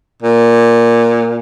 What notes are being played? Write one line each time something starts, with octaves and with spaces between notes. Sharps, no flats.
A#2